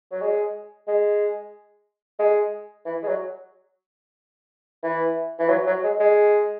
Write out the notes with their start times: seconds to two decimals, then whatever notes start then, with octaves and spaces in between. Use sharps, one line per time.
0.12 F#3
0.21 G#3
0.88 G#3
2.19 G#3
2.85 E3
3.03 G#3
3.07 F#3
4.83 E3
5.39 E3
5.49 F#3
5.67 F#3
5.83 G#3
6.00 G#3